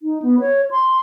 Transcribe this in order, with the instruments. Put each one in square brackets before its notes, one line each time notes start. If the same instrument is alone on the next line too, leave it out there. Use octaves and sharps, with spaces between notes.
[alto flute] D#4
B3
C#5
C6